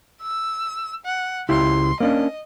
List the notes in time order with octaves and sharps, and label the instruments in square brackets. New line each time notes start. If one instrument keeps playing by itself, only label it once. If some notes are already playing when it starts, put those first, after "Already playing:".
[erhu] E6
F#5
[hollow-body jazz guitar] C#2 E4 G4 [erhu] C6
[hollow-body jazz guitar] A#3 C#4 D4 [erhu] D#5